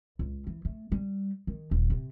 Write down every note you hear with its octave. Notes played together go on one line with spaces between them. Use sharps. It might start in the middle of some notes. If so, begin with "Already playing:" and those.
C#2
E3
A3
G3
D#3
D#1
C3